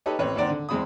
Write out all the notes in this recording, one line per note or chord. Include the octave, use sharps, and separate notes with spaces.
D#4 G4 A4 B4 C#5 D#5
A1 C4 B4 C#5
D#2 G#2 C4 D5 F#5 A#5
D3
E2 G#3 C4 B5 D#6